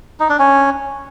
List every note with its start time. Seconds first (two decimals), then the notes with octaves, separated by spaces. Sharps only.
0.20 D#4
0.29 D4
0.39 C#4